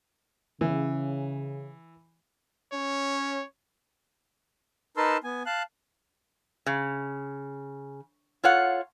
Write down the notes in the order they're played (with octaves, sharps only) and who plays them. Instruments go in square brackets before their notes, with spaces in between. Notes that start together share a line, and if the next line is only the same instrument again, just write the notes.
[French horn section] C#3 [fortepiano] E3
[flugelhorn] C#4 [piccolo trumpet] C#5
[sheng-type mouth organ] D#4 A#4 B4 A5 C6 E6
B3 G#5
F5 A5 F#6
[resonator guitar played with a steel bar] C#3
F4 A4 C#5 F5 F#5